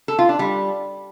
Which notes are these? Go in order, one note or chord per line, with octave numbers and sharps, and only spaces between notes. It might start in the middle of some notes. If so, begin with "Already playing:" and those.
A4
F4
D4
G3